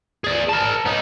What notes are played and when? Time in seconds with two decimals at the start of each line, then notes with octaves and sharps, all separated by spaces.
0.24 G#4 D5
0.49 A#4 A5
0.86 B3 D#4